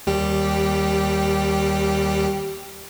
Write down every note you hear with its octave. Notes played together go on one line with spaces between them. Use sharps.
D#2 G3 G4